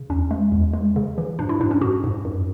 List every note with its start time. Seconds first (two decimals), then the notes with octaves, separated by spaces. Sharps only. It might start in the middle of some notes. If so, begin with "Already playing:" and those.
Already playing: C#3
0.10 E2 C#4
0.31 G#3
0.52 E2
0.74 G#3
0.96 C#3
1.18 E3
1.39 G#2 D4
1.49 E4
1.60 G#2 D4
1.71 C#4
1.81 G#2 F#4
2.04 G#2
2.25 F#2